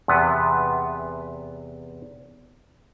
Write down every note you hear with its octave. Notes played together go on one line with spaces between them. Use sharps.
E2 C3 B3 B4